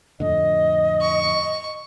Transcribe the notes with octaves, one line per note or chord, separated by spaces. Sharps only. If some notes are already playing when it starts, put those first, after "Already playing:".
F2 A2 D3 D#5
C#6